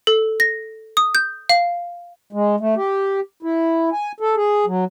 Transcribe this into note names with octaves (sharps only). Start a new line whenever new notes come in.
A4
A#6
D#6
G6
F5
G#3
A3
G4
E4
G#5
A4
G#4
F#3